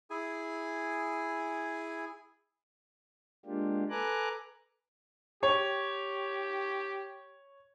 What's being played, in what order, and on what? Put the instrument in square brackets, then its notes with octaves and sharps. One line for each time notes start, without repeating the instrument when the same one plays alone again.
[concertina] E4 G#4 G#5
[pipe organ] G#3 A#3 D4 F4 G4
A4 B4 G#5 A#5 D6 F#6
[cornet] G4 [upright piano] C#5